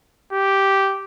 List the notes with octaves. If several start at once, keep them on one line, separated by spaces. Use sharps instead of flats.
G4